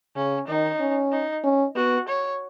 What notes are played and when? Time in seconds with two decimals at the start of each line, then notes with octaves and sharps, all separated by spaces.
0.16 C#3 C#4
0.47 D#3 D#4
0.80 C#4
1.12 D#4
1.44 C#4
1.75 B3 F#4
2.08 C#5